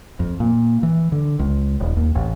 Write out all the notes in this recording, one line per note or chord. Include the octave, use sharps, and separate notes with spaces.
F2
A#2
E3
D3
C#2
D#1
D#2
A1